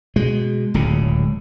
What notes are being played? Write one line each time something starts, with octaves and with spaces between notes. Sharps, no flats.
B2 G#3
D1 C#2 C#3